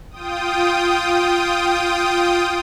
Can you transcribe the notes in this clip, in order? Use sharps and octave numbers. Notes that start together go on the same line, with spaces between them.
F4 G5 D#6